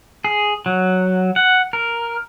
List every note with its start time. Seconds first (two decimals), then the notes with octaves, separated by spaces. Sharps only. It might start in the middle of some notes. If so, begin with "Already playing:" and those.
0.25 G#4
0.66 F#3
1.36 F#5
1.73 A#4